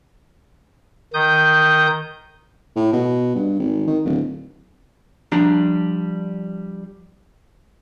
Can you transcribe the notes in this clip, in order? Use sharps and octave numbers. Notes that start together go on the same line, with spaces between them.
D#3 D#6 G6
A2
B2
G2
G#1
D#3
D1
F3 G3 D4 A#5